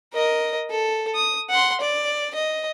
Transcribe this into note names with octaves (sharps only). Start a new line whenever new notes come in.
A#4 D#5
A4
D#6
F#5 C6
D5
D#5